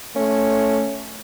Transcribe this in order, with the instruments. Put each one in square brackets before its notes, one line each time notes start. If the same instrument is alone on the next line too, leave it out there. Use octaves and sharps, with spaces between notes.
[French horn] A3 [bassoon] C#4